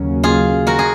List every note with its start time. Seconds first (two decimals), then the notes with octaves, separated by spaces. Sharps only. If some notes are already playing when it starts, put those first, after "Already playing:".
Already playing: D#2 C#3 F#3 A#3 C#4
0.23 F4 G#4
0.67 F#4 A#4
0.79 G#4